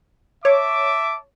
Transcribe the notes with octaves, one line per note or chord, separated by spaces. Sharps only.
C#5 E5 A5 D6